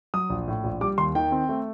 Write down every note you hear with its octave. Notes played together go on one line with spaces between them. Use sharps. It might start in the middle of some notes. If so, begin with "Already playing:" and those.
F#3 D#6
A#1
A2
A#1
G3 D6
D#2 C6
D#3 G5
C4
A3